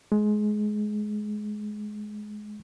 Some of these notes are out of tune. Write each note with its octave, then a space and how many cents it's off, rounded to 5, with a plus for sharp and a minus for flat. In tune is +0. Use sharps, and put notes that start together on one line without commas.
G#3 +20